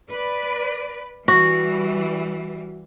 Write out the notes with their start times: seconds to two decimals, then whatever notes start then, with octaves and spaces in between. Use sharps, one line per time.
0.11 B4 D5
1.28 E3 G3 F#4